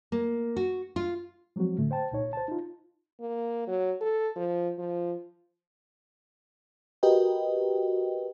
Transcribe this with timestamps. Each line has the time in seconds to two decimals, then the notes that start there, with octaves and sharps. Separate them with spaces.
0.12 A#3
0.56 F#4
0.96 F4
1.56 F3 F#3 G#3 C4 F#4
1.78 A2 D3 A3
1.91 C5 G5 A5
2.11 C2 A#2 D#4 C#5
2.33 C5 A5
2.48 D#4 F4
3.20 A#3
3.67 F#3
4.01 A4
4.36 F3
4.78 F3
7.03 F#4 G4 A#4 B4 D#5 G5